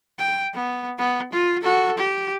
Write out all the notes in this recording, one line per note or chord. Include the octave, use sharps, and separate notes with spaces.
G5
B3
B3
F4
F#4 A4
G4